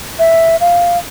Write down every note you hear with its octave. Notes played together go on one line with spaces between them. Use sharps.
E5
F5